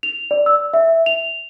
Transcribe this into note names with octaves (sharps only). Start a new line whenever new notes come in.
F7
D5
E6
E5
F7